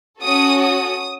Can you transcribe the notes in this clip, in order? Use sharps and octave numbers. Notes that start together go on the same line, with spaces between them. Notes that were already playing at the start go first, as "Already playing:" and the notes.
C#4 F#4 A4 D#6
D#6